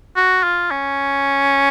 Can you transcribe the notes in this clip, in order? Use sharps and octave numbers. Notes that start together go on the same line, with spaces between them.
F#4
F4
C#4